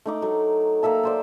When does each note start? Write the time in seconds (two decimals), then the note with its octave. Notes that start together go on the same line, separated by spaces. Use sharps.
0.06 A3 D#4 D6
0.22 F#3 A3
0.83 A#3 A4 E5 A5
1.03 A4 C5 D5